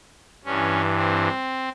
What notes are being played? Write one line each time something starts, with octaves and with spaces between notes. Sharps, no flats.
G2 E3 C#4
C4